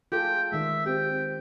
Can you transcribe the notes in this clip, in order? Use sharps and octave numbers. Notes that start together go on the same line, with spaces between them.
F4 G#4 A4 G5
D#3 G#3 E5
C4 G4 G5